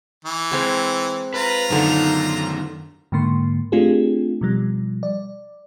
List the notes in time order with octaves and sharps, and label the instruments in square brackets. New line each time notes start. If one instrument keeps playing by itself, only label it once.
[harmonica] E3
[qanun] G#3 C4 A#4
[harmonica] F4 A#5 [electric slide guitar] B4
[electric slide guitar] F#2 D#3 [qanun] D3 D#4
[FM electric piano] G#2 D3 A#3 C6
A3 C4 D4 F4 G4 G#4
B2 F3 G3
D5